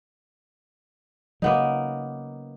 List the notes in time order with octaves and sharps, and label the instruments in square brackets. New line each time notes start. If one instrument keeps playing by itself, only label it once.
[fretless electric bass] C#3 F#3 [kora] A#3 B3 D#4